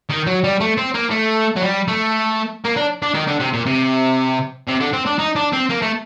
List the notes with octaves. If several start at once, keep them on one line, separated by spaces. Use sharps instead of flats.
D#3
F#3
G3
A3
C4
A#3
A3
F#3
G3
A3
A#3
D4
D4
D#3
D3
C3
A#2
C3
C3
D3
C4
D4
D#4
D4
C4
A#3
A3